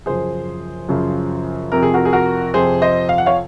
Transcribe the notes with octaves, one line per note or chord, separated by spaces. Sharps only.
F#2 C#3 F3 G#4 C5
F#2 C#3 F3
F2 C3 F3 A#4
G#4
F#4 A#4
G#4
F#4 A#4
F2 C3 F3 G#4 C5
C5 D#5
F5
F#5
C#5 F5